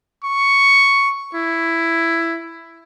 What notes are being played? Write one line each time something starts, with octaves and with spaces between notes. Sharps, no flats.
C#6
E4